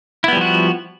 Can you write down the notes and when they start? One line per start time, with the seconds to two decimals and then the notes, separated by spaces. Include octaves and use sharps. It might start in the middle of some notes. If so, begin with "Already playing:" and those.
0.24 E4
0.28 B3
0.33 G3
0.37 F3
0.41 F#4